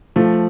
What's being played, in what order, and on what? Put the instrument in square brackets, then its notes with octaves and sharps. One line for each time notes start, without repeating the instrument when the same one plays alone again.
[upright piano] F3 A3